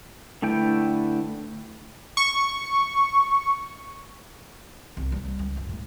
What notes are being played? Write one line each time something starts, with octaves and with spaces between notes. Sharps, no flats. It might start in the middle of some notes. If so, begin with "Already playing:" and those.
D3 A3 E4 B4 G5
C#6
C2
G3
C#2
F#2
A2